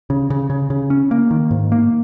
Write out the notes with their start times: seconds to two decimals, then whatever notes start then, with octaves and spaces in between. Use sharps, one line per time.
0.10 C#3
0.30 C#3
0.50 C#3
0.70 C#3
0.90 C#4
1.11 A#3
1.31 D#3
1.51 G#2
1.72 A#3